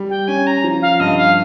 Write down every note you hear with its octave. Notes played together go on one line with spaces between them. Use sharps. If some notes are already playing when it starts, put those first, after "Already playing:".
Already playing: G3
G5
C#4 G#5
A#5
F3
F5
G2 D#5
F5